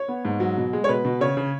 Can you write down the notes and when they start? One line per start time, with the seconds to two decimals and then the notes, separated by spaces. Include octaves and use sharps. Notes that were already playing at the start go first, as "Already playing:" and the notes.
Already playing: C#5
0.08 B3
0.25 G#2
0.40 F#3
0.57 B2
0.73 G#3
0.84 C#5
0.89 B2 B4
1.05 B2
1.21 C#3 C#5
1.37 C#3